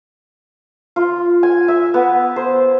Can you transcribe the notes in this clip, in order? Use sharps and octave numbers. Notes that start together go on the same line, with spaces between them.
F4
G#5
E5
B3
C5